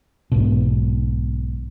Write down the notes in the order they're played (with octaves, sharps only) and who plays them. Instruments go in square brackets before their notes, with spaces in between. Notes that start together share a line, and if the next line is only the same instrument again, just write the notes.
[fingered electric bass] B1 G#2 B2